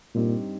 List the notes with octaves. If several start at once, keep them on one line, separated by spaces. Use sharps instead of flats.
G2 A#2 G3 C4 D#4 G4